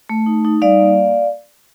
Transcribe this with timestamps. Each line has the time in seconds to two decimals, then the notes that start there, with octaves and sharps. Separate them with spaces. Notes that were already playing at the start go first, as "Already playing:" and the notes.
0.09 A3
0.26 D#4
0.45 D#4
0.62 G3 D5 F5
0.80 A#3